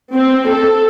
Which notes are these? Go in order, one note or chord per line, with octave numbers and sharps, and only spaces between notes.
C4
A4